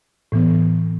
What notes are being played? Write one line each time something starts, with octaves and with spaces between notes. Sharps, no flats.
A2 E3 B3